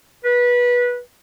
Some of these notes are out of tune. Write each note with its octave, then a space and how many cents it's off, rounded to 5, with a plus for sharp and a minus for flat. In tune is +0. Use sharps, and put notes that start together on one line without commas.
B4 -20